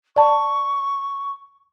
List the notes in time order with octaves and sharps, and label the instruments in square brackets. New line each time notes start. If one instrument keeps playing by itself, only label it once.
[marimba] D5 A5 [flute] C#6